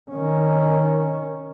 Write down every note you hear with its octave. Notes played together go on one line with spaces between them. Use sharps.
D#3 C#4